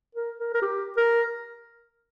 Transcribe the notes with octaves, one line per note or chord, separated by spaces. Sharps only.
A#4
A#4
A#4
G4
A#4